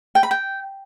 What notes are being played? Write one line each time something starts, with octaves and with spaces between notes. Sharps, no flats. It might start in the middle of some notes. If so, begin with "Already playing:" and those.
G5
B5
G5